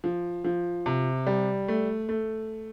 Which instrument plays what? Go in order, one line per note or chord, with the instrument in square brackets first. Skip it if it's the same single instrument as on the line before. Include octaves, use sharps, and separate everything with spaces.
[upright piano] F3
F3
C3
G3
A3
A3